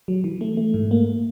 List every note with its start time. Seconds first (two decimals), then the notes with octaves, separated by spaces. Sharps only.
0.08 F#3
0.24 E3
0.41 A3
0.57 A3
0.74 G#2
0.91 A#3